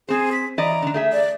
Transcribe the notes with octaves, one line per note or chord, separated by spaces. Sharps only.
C4 G#4 C5
B6
E3 D5 D#5 A#5
D3 D4
A3 G#4 E5
D5